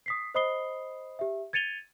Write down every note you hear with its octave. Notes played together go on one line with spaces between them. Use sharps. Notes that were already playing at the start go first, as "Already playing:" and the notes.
D#6 B6 C7
C5 D#5 B5 D#6 C7 G7
G4 E5
G#6 A6 C#7 D#7 F7 G7